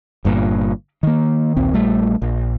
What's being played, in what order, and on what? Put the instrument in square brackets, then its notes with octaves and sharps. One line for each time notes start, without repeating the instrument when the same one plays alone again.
[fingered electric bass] G1 G2 A#2
D#3 A#3
A#1 D#2 C4
A#1 G3 A3
A#1